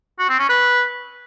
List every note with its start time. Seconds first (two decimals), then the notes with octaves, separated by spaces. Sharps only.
0.19 F#4
0.29 C4
0.39 C#4
0.49 B4